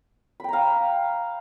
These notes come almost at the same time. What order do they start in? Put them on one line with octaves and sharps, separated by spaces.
B5 G5 A#5 F5